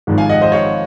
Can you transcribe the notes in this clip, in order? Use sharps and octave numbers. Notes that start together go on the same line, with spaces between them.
G#1 G#2 F3
F5 G#5
D#5 F#5
C5 D#5
C#5 F5